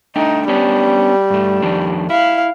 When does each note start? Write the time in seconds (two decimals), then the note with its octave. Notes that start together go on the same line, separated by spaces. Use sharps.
0.16 A3 D4 D#4 G5
0.48 G3 B3 C#4 D4
1.30 G2 A3
1.62 F2 D#3 D4
2.10 E4 F5